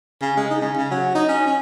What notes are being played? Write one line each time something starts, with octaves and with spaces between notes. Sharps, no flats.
C#3
G#3
D#4
C#3
C#3
F#3
D#4
C#4
C#4